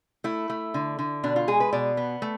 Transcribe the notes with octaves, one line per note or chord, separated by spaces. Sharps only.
A3 E4
A3
D3
D3
B2 D4
F4
G#3 G#4
B4
B2 D5
B3
A3